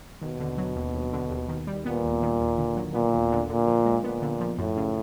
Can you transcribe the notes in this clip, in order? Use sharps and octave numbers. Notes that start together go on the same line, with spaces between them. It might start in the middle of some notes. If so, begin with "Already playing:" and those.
D#2 B2
D3
F#3
D#2
D#2
D3
D#2
D#3
G3
A#2 B3
D#2
D#3
D#2
D3
F#3
A#2 B3
D#2
D3
A#2 D3
F3
G#3
A#2 B3
D3
F3
F#2 A2
C#3